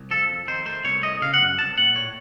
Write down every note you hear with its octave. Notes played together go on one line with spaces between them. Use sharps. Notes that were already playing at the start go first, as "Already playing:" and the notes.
Already playing: C2
F3 A4
F2
D#3 C5
A3 C5
C2 C#5
A3 D#5
C#3 F5
F#5
F#2
C2 A5
A#2 F#5
A2 C#5